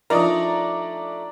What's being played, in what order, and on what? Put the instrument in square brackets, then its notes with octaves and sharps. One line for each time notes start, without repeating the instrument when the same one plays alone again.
[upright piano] F3 D#4 [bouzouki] A3 [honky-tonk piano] D4 D5 A#5 [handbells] A#4 D#6